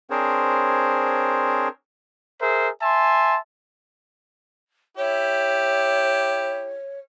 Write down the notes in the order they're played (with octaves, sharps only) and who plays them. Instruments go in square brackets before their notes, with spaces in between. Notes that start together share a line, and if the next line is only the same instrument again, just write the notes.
[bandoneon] C4 D4 G#4 A#4 C5 C#5
[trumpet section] G#4 A#4 C5 E5
E5 G#5 A5 C6
[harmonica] E4 G4 [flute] C#5